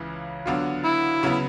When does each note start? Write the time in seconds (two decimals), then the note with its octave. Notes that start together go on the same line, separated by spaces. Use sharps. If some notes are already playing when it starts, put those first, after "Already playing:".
Already playing: C#2 C#3 E3
0.46 D3 F#3 B3 D4 F4
0.84 E4
1.23 C#3 F#3 B3